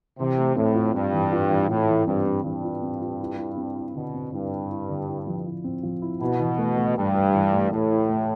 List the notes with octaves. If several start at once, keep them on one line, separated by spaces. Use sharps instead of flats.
C3 E3
A3
A2 C4
F4
G2 C4
E3
F4
E3
A2 F4
E3
G2 C4
C4
G2 E3
F4
C4
F4
E4
E4
C4
E4
B2 D3
C4
G2 E4
E4
E4
D3
E4
F3
E4
C4
F3
E4
B2 E4
E3
A3
A3
G2 A3
G4
E3
A3
A2 A3
E4
A3